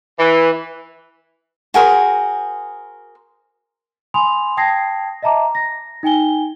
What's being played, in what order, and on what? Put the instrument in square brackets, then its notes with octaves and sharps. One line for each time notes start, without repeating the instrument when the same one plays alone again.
[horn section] E3
[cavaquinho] F#4 G#4 A#4 C5
[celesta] G#5 B5 C6 D#6 F7
G5 A5 D#6 G#6 A#6 C7
D#5 E5 A5 A#5 D6
A#6
D#4 G5 G#5 G7